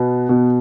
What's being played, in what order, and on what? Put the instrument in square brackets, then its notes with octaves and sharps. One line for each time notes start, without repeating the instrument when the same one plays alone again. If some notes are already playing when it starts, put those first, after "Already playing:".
Already playing: [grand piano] B2 B3
B2